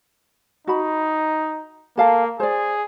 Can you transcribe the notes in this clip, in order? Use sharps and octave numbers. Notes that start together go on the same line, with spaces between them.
D#4 F#4 B5
A#3 A4 F5 A5
G#4 C5 D5